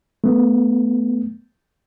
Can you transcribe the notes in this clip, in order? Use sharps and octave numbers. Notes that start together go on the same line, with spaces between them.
A3 B3